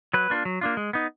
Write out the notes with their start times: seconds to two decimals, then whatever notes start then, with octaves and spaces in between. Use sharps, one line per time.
0.14 F#3 B4
0.30 A#3 D4 F4
0.45 F#3
0.61 A#3 D4 F4
0.77 G#3
0.93 B3 D#4